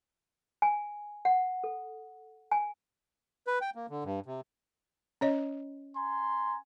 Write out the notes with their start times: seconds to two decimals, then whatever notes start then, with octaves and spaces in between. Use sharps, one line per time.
0.62 G#5
1.25 F#5
1.64 A4
2.51 G#5
3.47 B4
3.61 G5
3.75 A#3
3.90 D3
4.04 G2
4.26 C3
5.21 C#4 C#5 D#5
5.95 G#5 A#5 C6